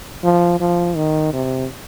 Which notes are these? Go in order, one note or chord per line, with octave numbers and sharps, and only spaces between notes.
F3
F3
D#3
C3